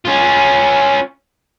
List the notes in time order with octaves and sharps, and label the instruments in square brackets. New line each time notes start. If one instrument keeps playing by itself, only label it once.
[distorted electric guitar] C#4 F4